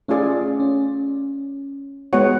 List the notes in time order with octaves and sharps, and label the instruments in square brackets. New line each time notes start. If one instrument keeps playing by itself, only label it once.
[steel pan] A3 F4 G#4 D5 [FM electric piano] C#4
[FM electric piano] C#4
[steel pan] G#3 B3 F#4 C#5 F#5